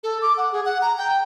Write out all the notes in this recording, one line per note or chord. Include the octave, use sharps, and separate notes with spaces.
A4
D6
F#5
G#4
F#5
A#5
G5